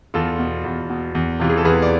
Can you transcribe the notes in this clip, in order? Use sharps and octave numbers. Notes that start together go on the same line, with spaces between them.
E2 F4 A4
B2
E2
B2
E2
C3 E3 F4
G#4
A4
E2 G#4 B4
D5